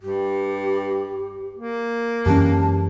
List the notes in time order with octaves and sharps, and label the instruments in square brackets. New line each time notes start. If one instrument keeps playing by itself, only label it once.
[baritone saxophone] G2 [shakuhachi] G4
[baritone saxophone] A#3
[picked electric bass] F#2 E3 G#3 [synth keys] C#4 G4 [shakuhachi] A5